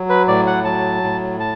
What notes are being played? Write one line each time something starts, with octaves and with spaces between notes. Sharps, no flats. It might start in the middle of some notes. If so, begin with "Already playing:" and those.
Already playing: F#3
B4
A2 D5
F#5
F#3 A5
A2
A5